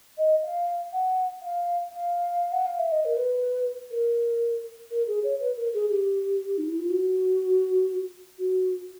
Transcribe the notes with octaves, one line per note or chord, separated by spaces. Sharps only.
D#5
F5
F#5
F5
F5
F#5
F5
E5
D#5
A#4
B4
A#4
A#4
G#4
C#5
B4
A#4
G#4
G4
D#4
E4
F4
F#4
F#4